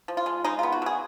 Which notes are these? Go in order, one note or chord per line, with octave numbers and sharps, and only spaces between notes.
F3
F4
G#3
G#3 D#4
B3 F4
F#4
B2 G#4